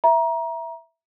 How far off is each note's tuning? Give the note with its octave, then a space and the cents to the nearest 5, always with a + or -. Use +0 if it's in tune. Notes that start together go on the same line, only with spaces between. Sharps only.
E5 +0 A#5 +25